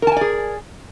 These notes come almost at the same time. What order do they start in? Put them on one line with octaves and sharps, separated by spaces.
A#4 A5 G#5 D5 G#4